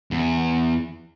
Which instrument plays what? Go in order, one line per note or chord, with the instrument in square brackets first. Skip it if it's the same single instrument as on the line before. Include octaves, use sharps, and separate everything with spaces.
[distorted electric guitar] E2